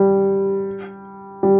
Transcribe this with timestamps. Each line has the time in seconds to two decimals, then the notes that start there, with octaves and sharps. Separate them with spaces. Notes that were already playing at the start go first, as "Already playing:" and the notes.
Already playing: G3
1.43 G3